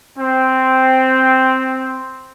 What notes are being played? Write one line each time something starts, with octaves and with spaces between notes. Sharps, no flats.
C4